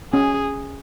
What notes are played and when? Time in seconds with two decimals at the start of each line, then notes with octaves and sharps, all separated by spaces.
0.13 C#4 G#4